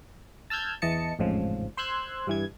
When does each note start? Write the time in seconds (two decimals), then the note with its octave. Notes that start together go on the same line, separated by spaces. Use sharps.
0.50 A5 E6 F6 G6 G#6
0.82 E2 E3 D#5 A5 C#7
1.19 A1 F2 G#2 C#3 F3
1.77 C5 C6 E6 F#6 G#6
2.27 G2 E3 G#6